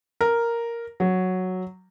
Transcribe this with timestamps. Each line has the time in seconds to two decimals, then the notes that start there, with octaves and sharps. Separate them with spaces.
0.21 A#4
1.00 F#3